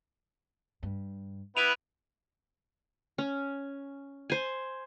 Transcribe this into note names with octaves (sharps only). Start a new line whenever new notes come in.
G2
B3 E4 B4 D7 D#7 F7
C#4
C5 G#5